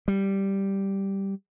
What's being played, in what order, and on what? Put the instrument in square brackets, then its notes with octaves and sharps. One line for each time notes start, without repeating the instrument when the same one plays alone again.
[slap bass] G3